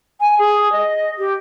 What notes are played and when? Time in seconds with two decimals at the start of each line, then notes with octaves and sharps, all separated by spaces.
0.21 G#5
0.39 G#4
0.72 D#5
1.19 G4